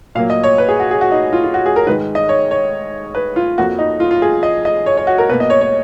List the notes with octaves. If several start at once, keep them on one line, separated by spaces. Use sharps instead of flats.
A#2 F#3 A#3 F5
D#5
C#5
B4
G#4
F#4
G#4
F#4
D#4
F4
F4
F#4
G#4
A#4
G#2 D#3 G#3 B4
D#5
C#5
C#5
B4
F4
F2 F3 A#3 F#4
D#4
F4
F4
G#4
D#5
D#5
C#5
C#5
F#4
A#4
B2 A#3 B4
D#5
C#5
C#5